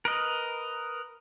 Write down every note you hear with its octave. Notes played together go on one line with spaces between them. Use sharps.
A#4 B4 D#5